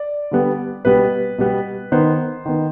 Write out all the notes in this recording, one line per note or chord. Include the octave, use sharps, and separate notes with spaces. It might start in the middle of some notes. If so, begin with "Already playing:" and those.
Already playing: D5
D3 G3 B3
B2 G3 B3 B4
B2 G3 B3
D#3 B3 C5
D#3 B3